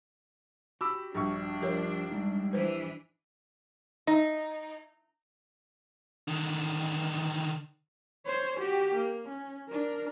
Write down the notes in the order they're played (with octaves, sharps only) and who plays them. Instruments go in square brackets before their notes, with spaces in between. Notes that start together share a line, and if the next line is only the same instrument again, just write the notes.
[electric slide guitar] F#4 G4 [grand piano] B5 D6 E6
[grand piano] A#1 G2 C#6 [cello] D4
[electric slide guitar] F3 G3 F4 [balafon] G4 A#4 C#5
[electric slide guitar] G3 G#3 D#4
[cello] E3 D4 [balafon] B4 C5
[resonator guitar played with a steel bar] D#4
[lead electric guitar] D3 D#3
[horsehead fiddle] C5 C#5
F#4 G4
A#3
C#4
D4 A#4